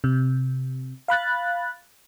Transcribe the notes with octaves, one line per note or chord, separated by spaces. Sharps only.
C3
F5 B5 F#6 A6